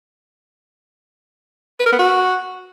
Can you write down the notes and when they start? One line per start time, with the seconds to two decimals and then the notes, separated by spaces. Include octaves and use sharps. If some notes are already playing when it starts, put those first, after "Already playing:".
1.79 B4
1.86 A#4
1.92 B3
1.99 F#4